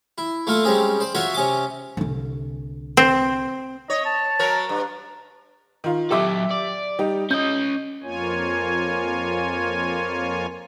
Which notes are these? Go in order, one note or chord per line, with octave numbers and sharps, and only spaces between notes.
E4
A3 A#3 F4 A4
G3 G#3 C4 C#4 D#4
C5 D5
F4 F#4 A#4 C#5 E5
C3 C#4 D#5 D6
C2 D3
C4
C#5 D#5
A5
F#3 A#4 C#5
G2
D#3 F4
F#3 G4 A4 E5 D6
D5
G3 D#4 G4
C#4 D#5 G6
F2 A#3 F4 C#5 G#5